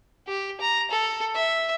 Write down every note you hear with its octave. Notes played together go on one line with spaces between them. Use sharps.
G4
A#5
A4
E5